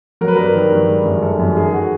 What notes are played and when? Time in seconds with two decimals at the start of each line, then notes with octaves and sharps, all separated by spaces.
0.21 F#3 A#4
0.28 B4
0.36 G2 A#4
0.54 D#3
0.72 G2
0.89 G#3
1.05 F#2
1.22 D#3 A4
1.39 F#2
1.56 D#3 G#4
1.74 F#4